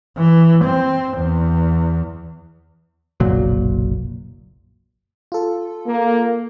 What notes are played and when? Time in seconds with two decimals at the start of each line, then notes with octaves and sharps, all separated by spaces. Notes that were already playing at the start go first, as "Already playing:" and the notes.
0.17 E3
0.65 C4
1.18 E2
3.20 F#1 B1 A#2 F#3
5.32 F4 A4
5.87 A#3